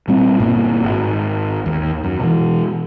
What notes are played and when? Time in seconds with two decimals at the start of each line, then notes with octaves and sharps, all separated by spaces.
0.08 A#2 G3 C4
0.40 G1 G2 A#2 A#3
0.83 G#1
1.66 D#2
2.04 F#2
2.19 B2 E3